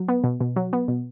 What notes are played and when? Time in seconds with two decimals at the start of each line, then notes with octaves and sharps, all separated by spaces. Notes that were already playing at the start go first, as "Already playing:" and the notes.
Already playing: F#3
0.08 B3
0.24 B2
0.40 B2
0.56 F#3
0.73 B3
0.88 B2